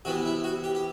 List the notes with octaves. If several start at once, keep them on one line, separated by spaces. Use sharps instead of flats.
C3 E3 B3 F#4
E4
F#4
G4
G4